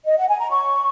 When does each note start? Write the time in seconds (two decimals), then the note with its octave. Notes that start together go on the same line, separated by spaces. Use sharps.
0.06 D#5
0.17 F#5
0.28 G#5
0.40 A#5
0.50 C#5 C#6